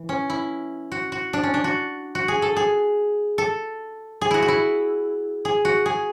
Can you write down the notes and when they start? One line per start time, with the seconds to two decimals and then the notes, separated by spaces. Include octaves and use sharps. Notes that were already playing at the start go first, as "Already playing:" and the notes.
Already playing: E3
0.09 C#4
0.30 E4
0.92 F#4
1.12 F#4
1.33 D4
1.43 C#4
1.54 D4
1.64 F#4
2.15 F#4
2.28 G#4
2.42 A4
2.56 G#4
3.38 A4
4.21 G#4
4.31 E4 F#4
4.42 F#4
4.48 E4
5.45 G#4
5.65 F#4
5.86 G#4